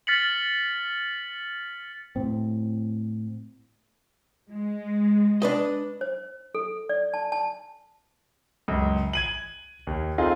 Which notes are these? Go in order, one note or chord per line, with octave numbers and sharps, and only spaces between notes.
F6 A6 B6 C#7 F#7
A2 C4
G#3
D4 B4 D#5
C5
A4
D5
A5
A5
C#2 F#2
G#6 D#7 F#7
D#2
C4 D#4 F4 G#4 A4